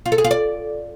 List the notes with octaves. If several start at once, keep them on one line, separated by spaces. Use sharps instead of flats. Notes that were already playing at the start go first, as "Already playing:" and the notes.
F4
A4
G#4
F4
D5